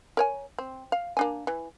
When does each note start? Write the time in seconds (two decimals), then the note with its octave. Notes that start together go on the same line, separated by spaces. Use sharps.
0.17 A#4 C#5 G#5
0.58 C4
0.92 F5
1.17 A#3 D4 G#5
1.47 E3